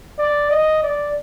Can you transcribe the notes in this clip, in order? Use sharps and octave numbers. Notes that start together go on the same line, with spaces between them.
D5
D#5
D5